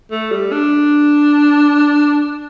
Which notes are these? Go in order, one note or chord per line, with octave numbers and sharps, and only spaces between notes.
A3
G3
D4